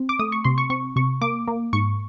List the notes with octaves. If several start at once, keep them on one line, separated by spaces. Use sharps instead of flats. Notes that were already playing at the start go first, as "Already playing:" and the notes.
Already playing: C4
D6
A3 D#6
C#6
C3 C6
C#6
C4 C#6
C3 C#6
A#3 D6
A#3
G#2 C#6